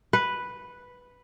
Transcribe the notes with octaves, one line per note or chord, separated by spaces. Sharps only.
B4